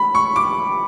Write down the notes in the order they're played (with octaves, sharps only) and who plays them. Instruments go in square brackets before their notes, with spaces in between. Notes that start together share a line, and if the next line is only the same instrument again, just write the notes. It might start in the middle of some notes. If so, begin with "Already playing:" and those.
Already playing: [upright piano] B5
C#6
D6